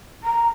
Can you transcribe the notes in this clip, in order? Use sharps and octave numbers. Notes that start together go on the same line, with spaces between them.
A#5